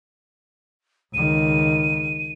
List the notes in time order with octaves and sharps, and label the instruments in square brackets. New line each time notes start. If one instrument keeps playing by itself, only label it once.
[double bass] C#2 D#3 [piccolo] D#7